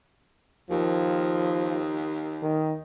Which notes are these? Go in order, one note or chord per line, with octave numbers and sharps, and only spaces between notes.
D#2 F3
D#3